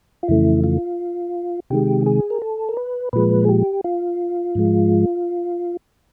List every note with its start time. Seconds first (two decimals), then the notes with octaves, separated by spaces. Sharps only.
0.23 F4
0.28 F2 C#3 E3 A3 E4
0.64 F4
1.70 C3 D#3 G#3 G4
2.06 G#4
2.30 A#4
2.42 A4
2.69 A#4
2.77 B4
3.13 A#2 F3 G#3 B4
3.44 G#4
3.49 G4
3.84 F4
4.55 G#2 F3 G#3